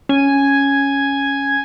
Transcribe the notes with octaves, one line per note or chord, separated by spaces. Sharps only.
C#4 G#5